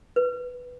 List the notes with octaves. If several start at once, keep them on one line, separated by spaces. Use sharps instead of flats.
B4